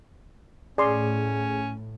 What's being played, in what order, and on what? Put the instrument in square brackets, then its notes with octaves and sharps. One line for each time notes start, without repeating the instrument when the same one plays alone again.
[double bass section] A2 [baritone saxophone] C#4 [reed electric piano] G#4 [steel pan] D5 C6